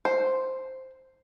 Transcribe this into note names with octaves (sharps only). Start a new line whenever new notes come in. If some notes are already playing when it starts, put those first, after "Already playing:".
C5